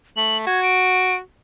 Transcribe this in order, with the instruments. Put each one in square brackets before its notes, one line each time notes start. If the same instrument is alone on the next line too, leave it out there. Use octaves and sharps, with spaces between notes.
[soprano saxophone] A3 [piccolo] F#7
[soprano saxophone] F#4 [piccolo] G#6
[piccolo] D7